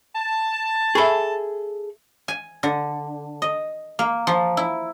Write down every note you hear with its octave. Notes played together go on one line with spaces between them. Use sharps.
A5
G#4 A4 E5 B5 C#6
G#5
D3
D#5
A#3
F3
E4